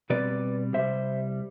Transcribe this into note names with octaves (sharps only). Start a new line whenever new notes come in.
B2 G3 C4 B4 D5
C2 C3 G3 C5 E5